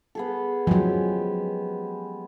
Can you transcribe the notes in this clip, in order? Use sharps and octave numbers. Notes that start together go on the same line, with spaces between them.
B3 G#4 A4
F3 F#3 G#3 G4 G#5